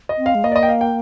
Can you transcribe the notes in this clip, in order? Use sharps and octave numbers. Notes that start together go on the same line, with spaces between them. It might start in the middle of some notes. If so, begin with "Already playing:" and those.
D#5
C4
F5
G#3
A#3 D#5
D5
D#5
G5
F5
G5